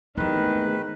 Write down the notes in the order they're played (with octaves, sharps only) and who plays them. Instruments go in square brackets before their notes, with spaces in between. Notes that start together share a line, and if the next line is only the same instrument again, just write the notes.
[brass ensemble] E2 G#2 C3 [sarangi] D#3 [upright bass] A3 D#4 [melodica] B4